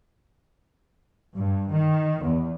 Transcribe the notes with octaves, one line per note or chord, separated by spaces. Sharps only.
G2
D#3
E2